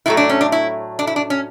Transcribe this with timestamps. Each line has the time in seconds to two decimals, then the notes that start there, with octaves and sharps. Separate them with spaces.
0.06 A2 F#3 A3 E4
0.17 D4
0.29 C#4
0.41 D4
0.52 E4
0.99 D4
1.07 E4
1.16 D4
1.30 C#4